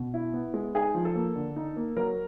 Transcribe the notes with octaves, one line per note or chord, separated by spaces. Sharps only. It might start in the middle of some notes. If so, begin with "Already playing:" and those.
Already playing: B2
E4
B3
G#3
D#4 G#4
F3
A4
A#3
D3
D#4
A#3
F#3 A#4